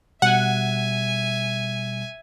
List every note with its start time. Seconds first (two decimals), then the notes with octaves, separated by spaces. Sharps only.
0.22 B2 G3 E5 F#5 G#5